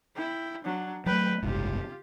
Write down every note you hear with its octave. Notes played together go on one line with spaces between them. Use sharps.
E4 G5
F#3 D4
F#3 A3 B4 G5
F#1 C2 G#2 F4 G4